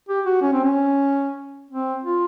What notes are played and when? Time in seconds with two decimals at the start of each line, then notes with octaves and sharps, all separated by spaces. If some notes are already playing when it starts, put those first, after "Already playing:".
0.09 G4
0.26 F#4
0.42 C#4
0.53 C4
0.64 C#4
1.71 C4
2.04 F4